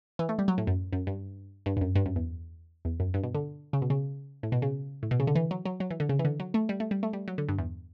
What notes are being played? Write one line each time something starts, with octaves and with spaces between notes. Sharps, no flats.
E3
A3
G3
F#3
A2
F#2
F#2
G2
G2
G2
F#2
G2
F#2
E2
E2
F#2
G2
B2
D3
C#3
B2
C#3
A2
B2
C#3
A2
B2
C#3
D3
E3
F#3
F#3
F#3
E3
D3
C#3
E3
D3
F#3
A3
G3
A3
G3
A3
G3
F#3
D3
G2
E2